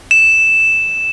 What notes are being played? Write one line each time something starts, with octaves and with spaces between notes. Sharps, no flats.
E7